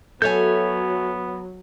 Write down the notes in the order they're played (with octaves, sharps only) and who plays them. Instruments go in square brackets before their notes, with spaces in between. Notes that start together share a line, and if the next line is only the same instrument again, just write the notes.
[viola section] F#3 [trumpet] B3 [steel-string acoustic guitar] A4 E5 G#5 [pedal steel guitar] C#5 G6